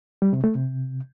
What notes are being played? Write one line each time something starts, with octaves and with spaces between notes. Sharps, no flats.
G3
C3
A3
C3